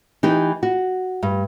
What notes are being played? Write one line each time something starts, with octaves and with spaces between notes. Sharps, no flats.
E3 D#4 G4
F#4
G2